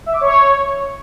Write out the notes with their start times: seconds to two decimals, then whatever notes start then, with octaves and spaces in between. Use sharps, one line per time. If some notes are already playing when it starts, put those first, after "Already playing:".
0.06 E5
0.14 D6
0.21 C#5